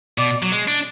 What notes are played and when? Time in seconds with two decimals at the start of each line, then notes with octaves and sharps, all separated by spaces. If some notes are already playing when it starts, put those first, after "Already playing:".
0.18 B2 D5
0.43 F#3
0.51 G#3
0.68 D4